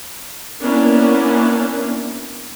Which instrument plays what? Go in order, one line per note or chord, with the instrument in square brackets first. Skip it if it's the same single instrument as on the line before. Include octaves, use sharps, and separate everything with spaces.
[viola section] A#3 B3 C#4 D4 E4